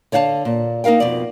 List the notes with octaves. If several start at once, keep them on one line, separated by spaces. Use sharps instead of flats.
D3 C#5 F5 F#5 A5
A#2
A#3 D#4 A#4 F5 G5
F2 B2 D5